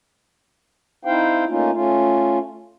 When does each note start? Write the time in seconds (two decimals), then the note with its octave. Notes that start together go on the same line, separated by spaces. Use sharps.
1.05 C4 D#4 E4 C5 F5 G5
1.48 A3 A#3 C#4 D#4 F4
1.72 A3 C#4 F4